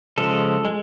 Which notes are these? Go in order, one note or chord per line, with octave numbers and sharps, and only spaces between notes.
C#3 F3 G#3 A4
G#3